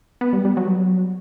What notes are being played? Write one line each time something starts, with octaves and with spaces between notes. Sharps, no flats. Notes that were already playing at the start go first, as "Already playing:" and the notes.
B3
G3
G3
F#3